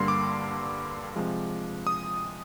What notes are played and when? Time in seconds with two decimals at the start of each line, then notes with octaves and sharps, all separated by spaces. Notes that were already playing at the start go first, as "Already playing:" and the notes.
Already playing: G2 D3 G3 A#3 C6
0.08 D6
1.16 C3 F3 G#3
1.87 D#6